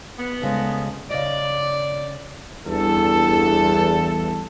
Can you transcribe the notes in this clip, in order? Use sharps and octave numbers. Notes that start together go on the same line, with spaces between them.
B3
D2 C#3 G#3
C#3 D5 D#5
E2 G2 A4